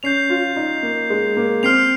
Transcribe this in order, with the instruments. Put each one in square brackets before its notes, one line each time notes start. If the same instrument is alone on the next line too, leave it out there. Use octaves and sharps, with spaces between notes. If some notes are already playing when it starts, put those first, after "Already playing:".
[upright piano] C#4 [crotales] G6 C7 F7
[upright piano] F4
D#4
A#3
G#3
A#3
[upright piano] C4 [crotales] F6 C7 F7